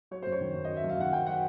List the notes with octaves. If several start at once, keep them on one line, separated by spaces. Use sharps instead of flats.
F#3 C#5
F#2 C5
C#5
D#3
F#2
F#3 D#5
E5
F#2
F5
D#3 F#5
F#2 G5
F#3 F#5